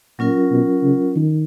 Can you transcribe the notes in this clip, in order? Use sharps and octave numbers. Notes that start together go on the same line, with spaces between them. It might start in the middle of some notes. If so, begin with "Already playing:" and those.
A#2 F#3 C#4 F4 A#4
B2
C#3
D#3